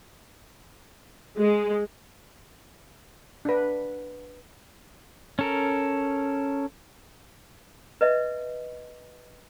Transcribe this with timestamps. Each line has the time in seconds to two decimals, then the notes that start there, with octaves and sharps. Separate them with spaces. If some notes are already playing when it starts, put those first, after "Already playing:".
1.38 G#3
3.45 D4 B4
5.39 C#4 A4 A#4
8.01 B4 D#5 E5